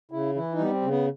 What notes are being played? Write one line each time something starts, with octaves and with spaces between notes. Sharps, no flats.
C#3 E4
E3 E4
D#4
G3 B3
C4
C#3
B3